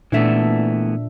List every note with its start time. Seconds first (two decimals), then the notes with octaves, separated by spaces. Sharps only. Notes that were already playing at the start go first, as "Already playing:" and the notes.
0.12 A#2 E3 A3 B3 D4 E5